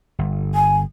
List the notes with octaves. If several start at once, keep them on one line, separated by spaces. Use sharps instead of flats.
G1
G#5